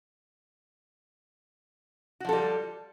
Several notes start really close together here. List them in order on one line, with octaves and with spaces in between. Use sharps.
F#4 F3 A4 G3